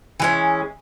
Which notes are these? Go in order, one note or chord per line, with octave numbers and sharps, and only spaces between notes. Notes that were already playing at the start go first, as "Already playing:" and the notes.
E3 G#3 C#4